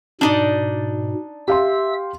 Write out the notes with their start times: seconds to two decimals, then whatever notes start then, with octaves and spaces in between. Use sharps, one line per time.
0.21 G#2 B2 D4 D#4 D5
1.48 G4 E5 F5 C6 E6